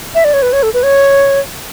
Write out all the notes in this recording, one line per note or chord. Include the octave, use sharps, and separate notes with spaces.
E5
D5
C#5
B4
C#5
A4
B4
C#5